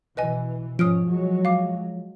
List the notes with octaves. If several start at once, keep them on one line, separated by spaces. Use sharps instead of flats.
B2 E3 B4 D#5 G#5
G#2 F3 C#4 D#6 F6 D7
F#3 G#3
F5 D6